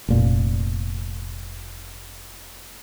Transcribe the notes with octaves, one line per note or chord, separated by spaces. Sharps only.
F1 A#2